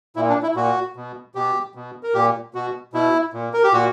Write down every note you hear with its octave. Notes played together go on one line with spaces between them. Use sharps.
A#2 E4
D4
E4
A#2 F#4
B2
B2 G4
B2
A#4
A#2 G4
B2 F#4
B2 E4
A#2
A#4
G4
A#2 F#4